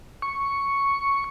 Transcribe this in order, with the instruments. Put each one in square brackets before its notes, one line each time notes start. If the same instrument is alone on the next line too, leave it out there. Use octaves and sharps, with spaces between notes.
[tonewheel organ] C#6